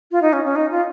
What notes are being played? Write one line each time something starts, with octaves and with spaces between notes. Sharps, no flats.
F4
D#4
C#4
C#4
D#4
F4